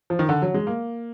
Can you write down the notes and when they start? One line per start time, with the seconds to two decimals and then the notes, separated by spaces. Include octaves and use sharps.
0.10 F3
0.19 D#3
0.29 D3
0.42 F#3
0.54 G#3
0.67 A#3